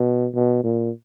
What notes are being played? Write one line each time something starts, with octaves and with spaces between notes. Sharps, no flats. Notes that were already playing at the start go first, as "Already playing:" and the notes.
Already playing: B2
B2
A#2